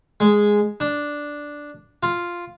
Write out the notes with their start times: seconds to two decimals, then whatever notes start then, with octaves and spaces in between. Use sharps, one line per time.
0.20 G#3
0.80 D4
2.03 F4